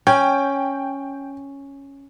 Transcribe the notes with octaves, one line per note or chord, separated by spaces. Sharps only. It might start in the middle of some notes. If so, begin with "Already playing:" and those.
C#4 G5